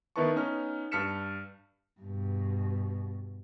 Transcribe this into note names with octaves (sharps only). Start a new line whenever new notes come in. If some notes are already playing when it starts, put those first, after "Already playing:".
D#3 B3 E4 B4 A5 C#6
B3 C#4 D#4 F6
G2 A5 F6 B6 C#7 E7
G2 B2